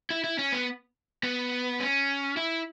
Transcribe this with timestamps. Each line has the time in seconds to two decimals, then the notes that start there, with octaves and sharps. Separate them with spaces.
0.10 E4
0.24 E4
0.39 C#4
0.52 B3
1.24 B3
1.80 C#4
2.37 E4